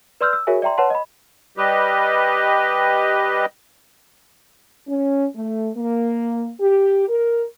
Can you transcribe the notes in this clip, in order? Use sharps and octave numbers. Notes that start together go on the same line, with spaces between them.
B4 D5 C6 E6 F6 G6
E6
F#4 G#4 A#4 C#5 E5 G#5
D5 E5 G5 A#5 C6
B4 C#5 F#5 A5 C6
D#5 B5
G3 G4 B4 D#5
C#4
A3
A#3
G4
A#4